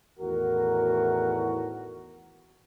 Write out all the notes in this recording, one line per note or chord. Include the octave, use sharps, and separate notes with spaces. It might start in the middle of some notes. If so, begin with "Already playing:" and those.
E2 A2 D#3 F#4 A#4